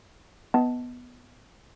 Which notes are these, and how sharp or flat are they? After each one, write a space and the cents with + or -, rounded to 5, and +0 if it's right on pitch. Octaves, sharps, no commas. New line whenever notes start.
B3 +0 D#5 +20 A5 +0